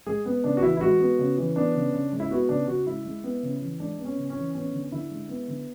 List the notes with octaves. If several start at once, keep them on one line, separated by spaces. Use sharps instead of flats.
G#3 G#4
B3
C#3 D4
F#4
E3 E4
E4
G#3 F#4
B3
C#3
E3
B3 D4
C#3
C#3
G#3
E4
B3 F#4
C#3 D4
C#3 F#4
G#3 E4
G#3
B3
C#3
E3
G#3 D4
B3
C#4
C#3
C#4
E3
B3 C#4
D3
D3 E4
G#3
B3
D3